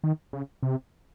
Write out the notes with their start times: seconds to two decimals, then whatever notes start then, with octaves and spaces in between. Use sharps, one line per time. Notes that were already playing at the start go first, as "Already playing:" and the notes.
0.04 D#3
0.33 C#3
0.63 C3